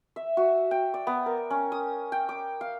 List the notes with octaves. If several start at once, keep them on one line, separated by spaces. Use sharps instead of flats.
E5
F#4
G5
D5
B3
A#4
C#4
D#6
G5
D6
F5